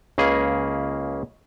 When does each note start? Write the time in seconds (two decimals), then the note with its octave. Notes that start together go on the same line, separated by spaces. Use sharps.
0.18 C#2 C#3 A#3 G#4